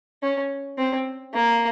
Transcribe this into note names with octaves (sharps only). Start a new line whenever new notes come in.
C#4
C4
A#3